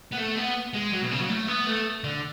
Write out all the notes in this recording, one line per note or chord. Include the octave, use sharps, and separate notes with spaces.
B3
A3
B3
G#3
F#3
B2
C#3
F#3
A3
B3
A3
D3